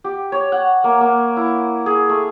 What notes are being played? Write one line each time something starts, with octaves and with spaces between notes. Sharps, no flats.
G4
C#5
F#5
A#3
A#3
E4
G#4
A3